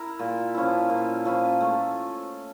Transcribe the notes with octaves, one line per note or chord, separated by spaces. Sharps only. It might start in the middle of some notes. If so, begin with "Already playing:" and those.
Already playing: E4 A#4
A#2
F3 C#4 E4
A#2
F3 C#4 E4
A3